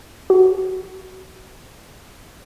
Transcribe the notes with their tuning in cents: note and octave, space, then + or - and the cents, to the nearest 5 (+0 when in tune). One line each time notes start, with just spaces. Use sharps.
F#4 +20